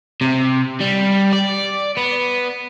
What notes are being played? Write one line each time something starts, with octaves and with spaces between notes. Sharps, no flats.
C3
G3
D5
B3